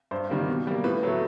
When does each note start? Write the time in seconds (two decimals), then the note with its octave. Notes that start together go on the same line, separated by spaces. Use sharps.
0.11 G2 C5
0.29 D#3 G3 A#3
0.48 B2
0.67 G3 A#3
0.84 A2 B4
1.03 F#3 A3